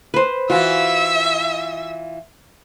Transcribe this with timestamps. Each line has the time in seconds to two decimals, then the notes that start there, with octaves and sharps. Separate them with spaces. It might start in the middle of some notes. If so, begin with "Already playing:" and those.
0.14 B4 C5
0.50 E3 F4 F#4 E5